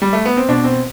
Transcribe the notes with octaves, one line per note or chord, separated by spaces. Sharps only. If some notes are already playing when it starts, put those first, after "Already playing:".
G3
A3
B3
C4
B2 D4
C4